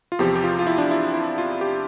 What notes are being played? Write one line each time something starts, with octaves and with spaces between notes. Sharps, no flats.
F4
E2 C3 F3 G4
G4
F4
F4
E4
D4
E4
E4
F4
G4